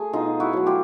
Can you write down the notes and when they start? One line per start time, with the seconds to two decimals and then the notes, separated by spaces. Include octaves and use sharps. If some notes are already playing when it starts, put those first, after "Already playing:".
Already playing: A3 G#4
0.13 B2 D#4 F4
0.40 E4 F#4
0.53 F#3 A3
0.66 F4 G4